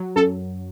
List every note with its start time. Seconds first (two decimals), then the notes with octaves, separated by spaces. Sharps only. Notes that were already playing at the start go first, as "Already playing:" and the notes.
Already playing: F#3
0.16 F#2 A4